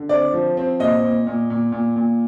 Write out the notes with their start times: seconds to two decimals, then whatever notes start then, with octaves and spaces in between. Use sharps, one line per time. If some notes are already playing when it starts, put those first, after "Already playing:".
Already playing: D3
0.09 C4 D5
0.33 F3
0.57 C4
0.80 A#2 D#5
1.03 A#2
1.27 A#2
1.50 A#2
1.72 A#2
1.96 A#2